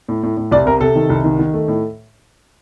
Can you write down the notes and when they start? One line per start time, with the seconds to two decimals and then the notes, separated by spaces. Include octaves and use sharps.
0.09 A2
0.23 A2
0.37 A2
0.51 C2 D5
0.66 C3 A#4
0.81 C3 A4
0.96 D#3
1.10 C2
1.24 D#3
1.39 D#3
1.54 A3
1.68 A2